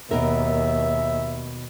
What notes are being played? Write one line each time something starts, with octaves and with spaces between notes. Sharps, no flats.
D#2 B2 A#4 E5